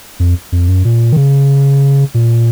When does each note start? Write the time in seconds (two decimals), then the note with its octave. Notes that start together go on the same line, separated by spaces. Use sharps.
0.20 F2
0.52 F2
0.68 F#2
0.85 A#2
1.12 D#3
1.16 C#3
2.14 A#2